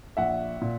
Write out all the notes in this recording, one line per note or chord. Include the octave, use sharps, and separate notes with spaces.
A#1 E5 F#5
A#2